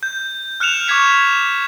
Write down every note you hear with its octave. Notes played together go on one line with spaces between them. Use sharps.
G6
F6 F#6 C#7 E7 F7
C#6 D6 F6 G#6 B6 C#7